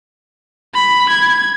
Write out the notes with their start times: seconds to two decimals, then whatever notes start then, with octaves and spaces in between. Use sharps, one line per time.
0.75 B5
1.10 G#6